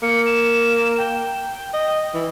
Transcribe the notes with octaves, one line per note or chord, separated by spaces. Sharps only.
A#3 C#7
E7
G5
D#5
E3